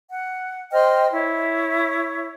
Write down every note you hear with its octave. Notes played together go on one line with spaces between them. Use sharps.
F#5
C5 D#5 G5 F6
E4 C#5